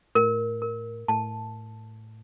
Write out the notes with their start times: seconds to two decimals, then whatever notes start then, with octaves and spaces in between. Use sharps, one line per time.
0.15 A2 A#4
0.62 A#4
1.08 A2 A5